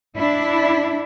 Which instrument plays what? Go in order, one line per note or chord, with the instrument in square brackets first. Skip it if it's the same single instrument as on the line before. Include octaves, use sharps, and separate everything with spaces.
[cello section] D4 E4